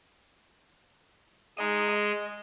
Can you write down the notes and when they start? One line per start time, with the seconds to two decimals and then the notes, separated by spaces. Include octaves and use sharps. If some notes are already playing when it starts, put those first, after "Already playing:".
1.58 G#3 D#5 A#5
1.89 D#5